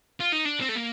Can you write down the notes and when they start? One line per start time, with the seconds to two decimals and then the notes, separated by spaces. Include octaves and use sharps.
0.20 F4
0.32 D#4
0.45 D4
0.60 C4
0.69 A3
0.76 A#3